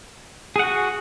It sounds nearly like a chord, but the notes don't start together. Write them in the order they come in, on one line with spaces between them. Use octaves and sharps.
G#4 F#5 F#4